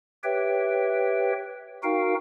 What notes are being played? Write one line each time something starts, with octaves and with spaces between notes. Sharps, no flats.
G4 B4 C#5 E5 G5
D#4 F#4 A#4 F5 G5